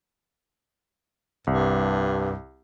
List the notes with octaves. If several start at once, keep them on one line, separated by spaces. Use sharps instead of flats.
C2 G2